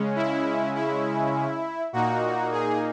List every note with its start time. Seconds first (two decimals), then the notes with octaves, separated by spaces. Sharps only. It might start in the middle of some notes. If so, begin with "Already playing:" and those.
Already playing: C#3 G#3 C#4
0.16 E4
0.75 E4
1.93 A#2 A#3 D#4 F#4
2.52 G#4